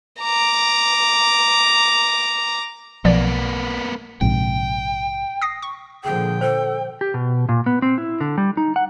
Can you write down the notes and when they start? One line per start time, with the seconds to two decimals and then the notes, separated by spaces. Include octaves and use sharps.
0.21 A#5 D6
3.05 B1 F3 A#3 B3 D5
4.21 A#1 G#2 C3 G5
5.42 D#6 A#6 C7
5.62 C#6
6.04 A#2 D3 F3 G#4 G5
6.41 A4 C5
7.01 G4
7.14 B2
7.49 A#2
7.66 B3
7.82 C4
7.98 E4
8.21 D3
8.38 G3
8.57 D#4
8.76 F#5